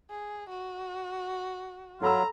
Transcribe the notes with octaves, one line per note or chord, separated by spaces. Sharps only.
G#4
F#4
F#3 F4 A4 A#5 B5 E6